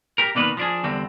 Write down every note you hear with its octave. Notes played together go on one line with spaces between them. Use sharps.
G4 A#4
B2 D#3 A#3 D4 D#4 B4
F3 D4 G#4
E2 D3 G3 C4